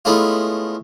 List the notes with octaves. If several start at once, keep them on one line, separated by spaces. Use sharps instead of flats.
G#3 A3 B3 C#4 E4 F4